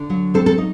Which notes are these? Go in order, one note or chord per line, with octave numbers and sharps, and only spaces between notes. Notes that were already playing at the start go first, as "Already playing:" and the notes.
Already playing: D3
F#3
C4 A4
A4
D#4